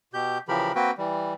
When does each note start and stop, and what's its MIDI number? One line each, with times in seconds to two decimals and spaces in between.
0.14 0.38 47
0.14 0.38 67
0.14 0.38 91
0.48 0.72 49
0.48 0.72 52
0.48 0.72 53
0.48 0.72 67
0.48 0.72 70
0.48 0.72 83
0.75 0.91 58
0.75 0.91 60
0.75 0.91 66
0.75 0.91 71
0.75 0.91 79
0.98 1.34 52
0.98 1.34 55